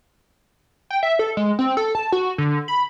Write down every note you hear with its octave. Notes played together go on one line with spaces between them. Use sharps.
G5
E5
A4
G#3
C4
A4
A5
F#4
D3
B5